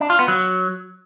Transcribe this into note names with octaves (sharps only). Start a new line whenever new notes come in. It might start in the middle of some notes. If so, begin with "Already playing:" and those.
D4
F4
B3
F#3